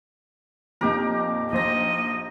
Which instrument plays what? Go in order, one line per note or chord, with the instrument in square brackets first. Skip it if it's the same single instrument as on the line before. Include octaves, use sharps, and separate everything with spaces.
[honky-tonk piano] F2 A#2 [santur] D#4 G4 A#4
[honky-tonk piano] A#1 C5 A#6 [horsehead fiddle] D#5